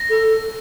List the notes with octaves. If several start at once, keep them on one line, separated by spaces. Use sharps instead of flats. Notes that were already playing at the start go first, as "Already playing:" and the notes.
Already playing: A#6
A4